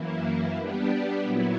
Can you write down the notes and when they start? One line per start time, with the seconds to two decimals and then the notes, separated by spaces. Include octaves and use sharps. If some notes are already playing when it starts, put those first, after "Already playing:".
Already playing: F#2 E3 A#3 E4
0.56 G3 B3 D4 G4
1.23 A#2 F#3 B3 E4